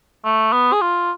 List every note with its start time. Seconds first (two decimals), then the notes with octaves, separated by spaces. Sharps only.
0.25 A3
0.53 B3
0.73 G#4
0.81 F4